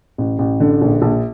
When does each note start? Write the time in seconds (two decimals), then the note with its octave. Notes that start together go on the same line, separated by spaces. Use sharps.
0.18 A1
0.39 A1
0.60 D3
0.81 A#1
1.02 A#1